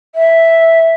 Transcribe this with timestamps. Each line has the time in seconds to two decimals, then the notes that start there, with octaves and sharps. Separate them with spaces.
0.15 E5